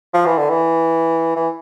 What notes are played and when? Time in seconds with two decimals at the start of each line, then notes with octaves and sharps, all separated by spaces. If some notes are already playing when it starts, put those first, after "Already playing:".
0.14 F3
0.26 E3
0.38 D3
0.50 E3
1.36 E3